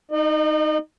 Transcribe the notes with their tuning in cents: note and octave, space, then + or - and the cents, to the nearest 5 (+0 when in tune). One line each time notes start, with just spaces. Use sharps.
D#4 +0 D#5 -40